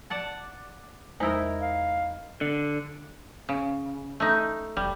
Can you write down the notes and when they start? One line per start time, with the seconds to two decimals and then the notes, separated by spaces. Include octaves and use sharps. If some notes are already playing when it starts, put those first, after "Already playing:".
0.10 D5 F#5 A5
1.20 E2 G#3 D#4 E4 A#4 C5
1.60 F5
2.41 D3
3.49 C#3
4.20 A3 D#4
4.77 F1 G3